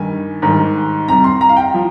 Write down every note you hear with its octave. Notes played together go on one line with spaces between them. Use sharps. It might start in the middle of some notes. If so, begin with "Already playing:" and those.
Already playing: G2 D#3 G3 G#5
G#2 D#3 G3
C3 G3 A#5
C6
A#5
F5
G5
F3